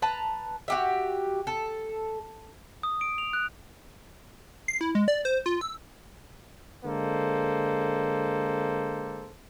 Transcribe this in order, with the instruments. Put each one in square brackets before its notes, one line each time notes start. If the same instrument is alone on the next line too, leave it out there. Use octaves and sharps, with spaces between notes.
[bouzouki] B4 A5 A#5
F#4 G4 E5
A4
[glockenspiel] D#6
D7
F7
F#6
[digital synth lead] C7
E4
G#3
D5
C5
F4
E6
[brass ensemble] D3 G#3 A#3 A4 C5